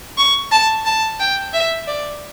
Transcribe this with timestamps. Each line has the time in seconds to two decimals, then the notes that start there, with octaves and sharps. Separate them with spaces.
0.17 C#6
0.51 A5
0.85 A5
1.20 G5
1.53 E5
1.87 D5